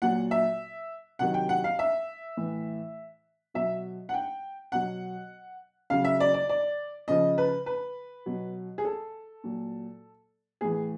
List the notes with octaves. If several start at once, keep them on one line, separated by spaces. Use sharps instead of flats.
A#2 F#3 F#5
E5
C3 D#3 F#3 F#5
G5
F#5
F5
E5
A2 E3
B2 F#3 E5
F#5
G5
B2 F#3 F#5
C#3 F#3 F5
E5
D5
D5
D5
C#3 F3 D#5
B4
B4
B2 F#3
G#4
A4
A#2 F#3
A2 E3 G#4